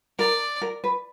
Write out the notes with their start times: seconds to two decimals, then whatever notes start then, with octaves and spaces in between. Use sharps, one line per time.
0.19 A#4 D5
0.62 A#4
0.84 B4